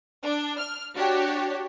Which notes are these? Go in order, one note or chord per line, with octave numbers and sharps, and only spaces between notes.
D4
F6
D4 F#4 G4 C#5